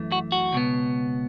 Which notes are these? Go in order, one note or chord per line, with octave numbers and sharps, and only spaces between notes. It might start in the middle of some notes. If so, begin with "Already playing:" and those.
Already playing: F#2 E3 A3
F#4
F#4
C#2 B2 B3